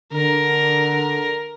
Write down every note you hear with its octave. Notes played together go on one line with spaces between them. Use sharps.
D3 A#4